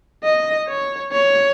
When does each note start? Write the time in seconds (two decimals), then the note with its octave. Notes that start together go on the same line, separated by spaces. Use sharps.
0.24 D#5
0.68 C#5
1.13 C#5